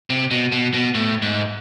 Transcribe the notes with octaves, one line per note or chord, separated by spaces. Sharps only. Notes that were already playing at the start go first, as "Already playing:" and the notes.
C3
B2
B2
B2
A2
G#2